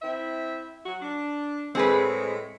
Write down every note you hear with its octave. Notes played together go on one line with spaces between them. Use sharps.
C4 E4 E5
F#3 F#4
D4
A2 G#3 C4 G#4 B4